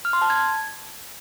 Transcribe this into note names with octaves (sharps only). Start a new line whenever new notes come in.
F6
C6
A5
G#6